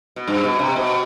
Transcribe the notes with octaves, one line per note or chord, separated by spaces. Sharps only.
B2
G2
B2
C3
B2